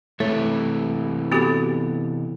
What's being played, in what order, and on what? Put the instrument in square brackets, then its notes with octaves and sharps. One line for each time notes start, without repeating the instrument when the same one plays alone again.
[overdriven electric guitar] C3 E3 [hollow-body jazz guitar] A3 [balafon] C#5
[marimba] B3 A4 [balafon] C4 F#4 G4